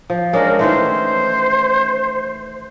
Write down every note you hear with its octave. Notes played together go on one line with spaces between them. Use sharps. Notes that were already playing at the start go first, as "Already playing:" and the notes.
F3
G#3 C#4 D4 A#4
D#3 E3 A3 C5